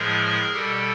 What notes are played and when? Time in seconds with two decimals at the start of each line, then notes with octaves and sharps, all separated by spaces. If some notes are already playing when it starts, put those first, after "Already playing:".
Already playing: A2 F3 G#3 G#4 A#4
0.53 B2 G3 G4 A4